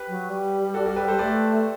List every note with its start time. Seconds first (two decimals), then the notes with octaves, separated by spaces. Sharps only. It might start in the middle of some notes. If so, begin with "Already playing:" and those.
Already playing: G4 B4
0.08 F#3
0.29 G3
0.74 F#4 A4
0.86 F#4 A4
0.96 G4 B4
1.08 A4 C5
1.19 A3 B4 D5